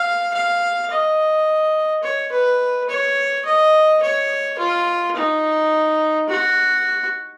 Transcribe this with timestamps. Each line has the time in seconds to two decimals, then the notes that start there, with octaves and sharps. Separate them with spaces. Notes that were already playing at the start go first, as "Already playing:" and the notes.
Already playing: F5
0.33 F5
0.91 D#5
2.03 C#5
2.31 B4
2.89 C#5
3.45 D#5
4.02 C#5
4.59 F4
5.16 D#4
6.29 F#4